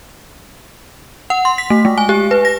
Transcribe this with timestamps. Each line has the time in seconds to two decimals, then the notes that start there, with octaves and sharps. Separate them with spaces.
1.30 F#5
1.45 C6
1.58 B6
1.70 A3
1.85 G#3
1.98 G#5
2.09 G4
2.31 B4
2.45 A#6